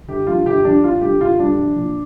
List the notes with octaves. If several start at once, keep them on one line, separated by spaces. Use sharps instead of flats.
G1 G4
G2 F3 F4
G1 G4
G2 F3 D4
G1 F4
G2 D3 G3 G4
G1 F4
G2 D3 G3 D4
A#1
A#2 F3